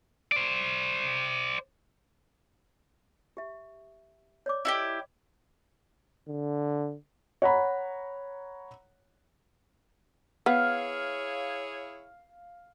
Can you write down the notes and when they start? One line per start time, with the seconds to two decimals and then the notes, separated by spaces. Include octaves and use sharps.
0.32 C5 D5
3.37 G4 E5
4.46 C#5 D5 D6
4.65 E4 F#4 G4 D#5
6.28 D3
7.42 C#5 F#5 A#5 B5
10.46 B3 E4 G#4 C#5 F5